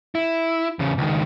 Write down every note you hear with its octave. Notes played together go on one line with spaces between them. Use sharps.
E4
E2 C#3
C#2 D#3